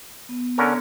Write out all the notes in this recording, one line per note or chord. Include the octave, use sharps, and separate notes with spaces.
B3
D3 C#4 A#4